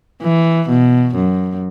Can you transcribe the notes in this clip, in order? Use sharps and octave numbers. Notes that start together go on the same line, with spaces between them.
E3
B2
F#2